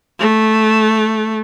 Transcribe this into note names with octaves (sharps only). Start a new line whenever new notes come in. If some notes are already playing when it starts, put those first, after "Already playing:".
A3